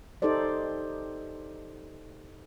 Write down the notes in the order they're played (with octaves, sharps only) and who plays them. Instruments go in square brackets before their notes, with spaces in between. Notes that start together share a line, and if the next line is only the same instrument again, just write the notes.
[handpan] D#4 G4 A4 C5 D5